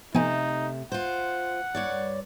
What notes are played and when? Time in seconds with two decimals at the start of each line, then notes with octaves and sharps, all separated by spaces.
0.15 C3 F3 A3 B3 D#4 G#5
0.92 F4 C5 F#5
1.75 G2 C#5 D5